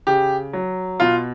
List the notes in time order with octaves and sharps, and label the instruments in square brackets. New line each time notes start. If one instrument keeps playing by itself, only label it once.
[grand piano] C#3 G4
F#3
B2 F4